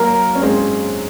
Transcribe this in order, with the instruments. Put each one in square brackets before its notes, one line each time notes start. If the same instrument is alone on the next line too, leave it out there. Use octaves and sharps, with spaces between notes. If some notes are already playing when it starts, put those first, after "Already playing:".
Already playing: [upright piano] F#3 A#3 [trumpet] A#4
[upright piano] C#4
G#3 C4